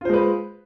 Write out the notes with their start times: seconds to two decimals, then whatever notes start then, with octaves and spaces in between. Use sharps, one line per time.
0.01 F4
0.05 C5
0.09 G#3
0.13 B4